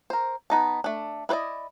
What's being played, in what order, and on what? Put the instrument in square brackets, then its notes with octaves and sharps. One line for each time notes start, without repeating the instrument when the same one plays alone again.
[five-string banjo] A#4 C5
B3 D#4 A5
A3 D4
E4 B4 C5 D5 D#5